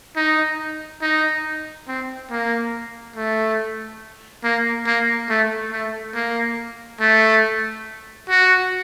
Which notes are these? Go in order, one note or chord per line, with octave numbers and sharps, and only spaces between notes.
D#4
D#4
C4
A#3
A3
A#3
A#3
A3
A3
A#3
A3
F#4